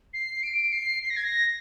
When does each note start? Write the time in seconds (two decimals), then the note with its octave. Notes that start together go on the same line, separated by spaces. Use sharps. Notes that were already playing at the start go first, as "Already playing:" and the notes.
0.13 C7
0.43 D7
0.72 C7
1.03 C7
1.10 A#6
1.16 G#6
1.24 A#6